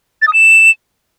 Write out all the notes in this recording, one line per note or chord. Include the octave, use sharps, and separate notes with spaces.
A6
D#6
E7